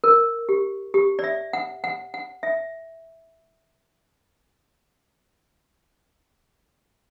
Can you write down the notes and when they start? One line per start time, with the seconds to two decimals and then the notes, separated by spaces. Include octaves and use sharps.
0.04 A#4
0.49 G4
0.94 G4
1.19 D5
1.24 E5
1.53 F#5
1.84 F#5
2.14 F#5
2.43 E5